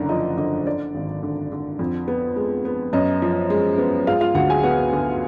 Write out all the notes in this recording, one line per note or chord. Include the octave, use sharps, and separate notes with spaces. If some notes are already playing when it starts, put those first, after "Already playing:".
Already playing: F#1 D3 D5 A#5
F3 D#5
D3 D#5
D3 D5
G#1
D3
D3
F2
B3
G#3
B3
F#2 D#5
F3
G#3
B3
G#3 F4 F5
F4 F5
D2 F#4 F#5
G#4 G#5
B3 F#4 F#5
D3